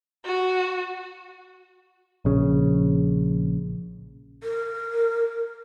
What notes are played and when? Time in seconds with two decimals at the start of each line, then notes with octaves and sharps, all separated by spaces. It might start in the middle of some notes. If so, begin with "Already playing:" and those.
0.25 F#4
2.25 A#1 C#3
4.43 A#4